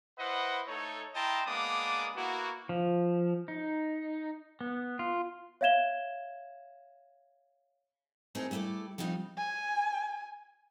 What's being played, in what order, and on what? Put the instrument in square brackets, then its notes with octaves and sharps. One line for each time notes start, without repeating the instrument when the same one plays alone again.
[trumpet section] E4 B4 C5 D#5 F#5
A3 D#4 A4 C#5
E4 D#5 G5 A5 A#5 C6
G#3 A#3 B3 D4 D6 D#6
A#3 B3 E4 F#4
[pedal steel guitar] F3
D#4
B3
F4
[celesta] C#5 E5 F5 G#6 E7 G7
[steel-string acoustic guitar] A3 C4 D#4 E4 G#4 A#4
G3 A3 E4 A4 D5
F3 G3 C4 D#4 F#4
[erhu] G#5